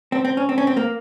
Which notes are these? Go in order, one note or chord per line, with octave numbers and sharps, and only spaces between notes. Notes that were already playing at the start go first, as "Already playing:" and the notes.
C4
C4
C#4
C4
C#4
C4
A#3